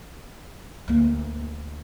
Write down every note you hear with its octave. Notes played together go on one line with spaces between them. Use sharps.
D2 A#3